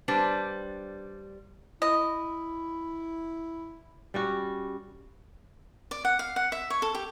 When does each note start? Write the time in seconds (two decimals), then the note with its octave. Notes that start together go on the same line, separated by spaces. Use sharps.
0.08 G3 D4 B4 C5
1.82 E4 D#5
4.14 G3 C#4 F#4
5.91 D5
6.05 F#5
6.19 F5
6.36 F#5
6.52 E5
6.70 C#5
6.82 A4
6.95 G4